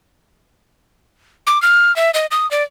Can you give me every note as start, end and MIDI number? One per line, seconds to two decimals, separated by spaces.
1.47 1.61 86
1.62 1.95 89
1.96 2.11 76
2.14 2.26 75
2.31 2.49 87
2.51 2.63 74